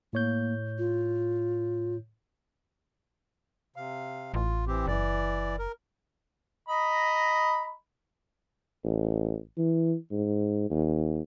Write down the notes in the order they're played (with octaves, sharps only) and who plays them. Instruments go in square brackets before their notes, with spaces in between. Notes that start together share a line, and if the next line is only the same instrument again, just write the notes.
[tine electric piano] A2 C#5 G6 [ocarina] A#3
[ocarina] F4
[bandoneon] C3 F5
[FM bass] A1 [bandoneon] F4
[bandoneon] E3 C4 G4
[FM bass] F#1 [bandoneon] E3 D5
[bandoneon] A#4
[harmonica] D#5 A#5 B5
[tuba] A1
E3
G#2
D#2